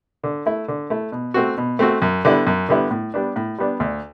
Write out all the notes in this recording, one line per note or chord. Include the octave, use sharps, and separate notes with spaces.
D3
A3 E4
D3
A3 E4
B2
A3 C4 F#4
B2
A3 C4 F#4
F#2
D3 G3 B3 E4
F#2
D3 G3 B3 E4
A2
G3 B3 D4
A2
G3 B3 D4
D2